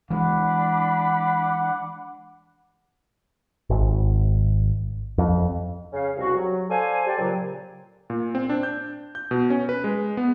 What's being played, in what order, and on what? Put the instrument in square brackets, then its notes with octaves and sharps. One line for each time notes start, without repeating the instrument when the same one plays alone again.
[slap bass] E3 G#3 [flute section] D4 B5 D6 [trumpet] F#5
[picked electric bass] G#1
F2
[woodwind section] C#3 C#4 F5
C2 F#4
F#3
A4 C5 D5 F5 G#5
G4 C5 D5
A#2 C#3 F#3
[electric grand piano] A#2
C4
D4
G6
G6
B2
C#4
B4
G#3
B3